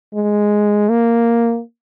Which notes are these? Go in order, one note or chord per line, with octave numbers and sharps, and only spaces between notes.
G#3
A#3